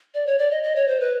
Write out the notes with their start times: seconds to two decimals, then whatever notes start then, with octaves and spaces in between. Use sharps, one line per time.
0.14 D5
0.27 C#5
0.38 D5
0.51 D#5
0.63 D#5
0.76 C#5
0.88 C5
1.00 B4